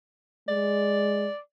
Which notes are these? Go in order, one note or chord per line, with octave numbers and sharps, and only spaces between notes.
G#3 D5